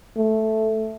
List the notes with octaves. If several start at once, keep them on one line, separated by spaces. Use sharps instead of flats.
A3